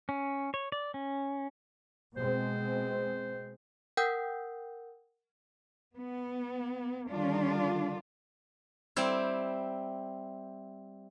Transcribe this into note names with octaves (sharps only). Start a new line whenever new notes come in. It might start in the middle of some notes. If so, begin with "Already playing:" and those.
C#4
C#5
D5
C#4
B2 G#3 C4 C5
A#4 F#5 G5 D#6 E6 G6
B3
D3 D#3 G3 D4 F4
G3 C4 E4